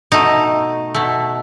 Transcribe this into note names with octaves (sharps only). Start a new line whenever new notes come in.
B2 A3 D#4
B2 A3